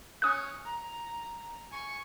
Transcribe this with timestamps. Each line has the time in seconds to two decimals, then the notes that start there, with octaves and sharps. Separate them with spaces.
0.22 C#4 D#6 F#6
0.65 A#5
1.71 G#5 C#6